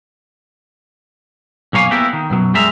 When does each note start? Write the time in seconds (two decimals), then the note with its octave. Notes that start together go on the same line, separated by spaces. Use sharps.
1.73 B1 F#2 A#3 C#5 F5 G#5
1.91 A#3 B3 E4 G4 A4 A#4
2.13 D#3
2.30 F#2 B2 F#3
2.54 F#2 G3 G#3 A#4 E5 A#5